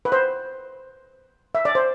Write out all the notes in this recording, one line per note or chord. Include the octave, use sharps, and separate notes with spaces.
B4
C5
E5
D5
C5